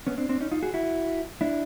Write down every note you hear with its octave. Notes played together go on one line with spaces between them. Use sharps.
B3 C#4
C4 D4
C4 D4
C#4 D#4
D#4 F4
F#4 G#4
E4 F#4
D4 E4